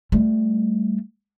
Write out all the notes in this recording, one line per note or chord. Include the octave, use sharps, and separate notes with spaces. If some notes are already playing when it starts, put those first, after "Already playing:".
G3 A3